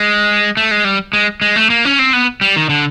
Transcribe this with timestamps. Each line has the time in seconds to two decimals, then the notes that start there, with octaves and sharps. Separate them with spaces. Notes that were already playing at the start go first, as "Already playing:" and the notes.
Already playing: G#3
0.57 A3
0.71 G#3
0.85 G3
1.13 G#3
1.41 G#3
1.56 A3
1.70 A#3
1.85 C#4
1.99 C4
2.13 B3
2.41 G3
2.56 D#3
2.69 D3